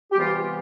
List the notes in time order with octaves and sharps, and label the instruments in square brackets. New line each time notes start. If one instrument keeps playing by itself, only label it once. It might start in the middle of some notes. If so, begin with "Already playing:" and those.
[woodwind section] G4
C3 E3 G3 B3 F4